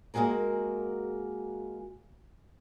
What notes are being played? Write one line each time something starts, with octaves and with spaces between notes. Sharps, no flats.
G#3 A#3 F#4 G#4 A#4